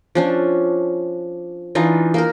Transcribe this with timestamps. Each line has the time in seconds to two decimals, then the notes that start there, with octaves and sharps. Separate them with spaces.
0.15 F3 C#4 D4
1.75 E3 D4 D#4 F4
2.14 A#3 D#4 A#4